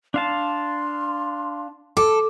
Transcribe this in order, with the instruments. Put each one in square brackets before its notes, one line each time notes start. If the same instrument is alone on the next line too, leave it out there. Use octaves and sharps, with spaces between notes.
[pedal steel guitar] D4 F5 A5 [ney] C6
[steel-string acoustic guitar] A4 [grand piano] D6